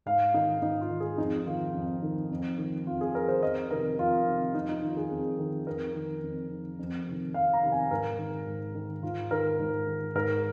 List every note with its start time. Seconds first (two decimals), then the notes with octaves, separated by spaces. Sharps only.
0.06 G#2 F5
0.34 D#3 D#4
0.62 G#2 D#4
0.81 F4
0.90 D#3
1.00 G#4
1.18 F2 D#4
1.46 D#3 F4
1.74 F2
2.03 D#3
2.31 F2
2.58 D#3
2.87 F2 F4
3.01 G#4
3.14 D#3 A#4
3.28 C5
3.43 F2 D#5
3.70 C3 D#3 A#4
3.98 F2 F4
4.27 C3 D#3
4.54 F2 D#4
4.69 D#4
4.82 D#3 F4
4.97 G#4
5.11 F2
5.39 D#3
5.67 F2 A#4
5.95 D#3
6.23 F2
6.51 D#3
6.79 F2
7.07 C3 D#3
7.34 F2 F5
7.53 A#5
7.63 C3 D#3
7.72 G#5
7.91 G#2 A#4
8.18 D#3
8.47 G#2
8.75 D#3
9.03 G#2 F4
9.31 D#3 A#4
9.59 G#2
9.87 D#3
10.15 G#2 A#4